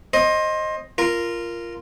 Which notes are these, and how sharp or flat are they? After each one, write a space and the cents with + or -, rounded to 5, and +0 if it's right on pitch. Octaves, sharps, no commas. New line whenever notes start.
C5 +25 D#5 +0
F4 -15 A#4 +0